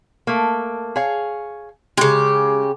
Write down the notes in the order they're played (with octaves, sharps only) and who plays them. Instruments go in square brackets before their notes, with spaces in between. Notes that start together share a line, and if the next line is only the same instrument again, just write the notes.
[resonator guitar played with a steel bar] A3 A#3
G#4 C#5 F5
[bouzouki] C#3 G4 [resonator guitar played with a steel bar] G#3